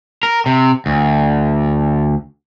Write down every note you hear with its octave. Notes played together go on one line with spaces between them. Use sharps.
A#4
C3
D2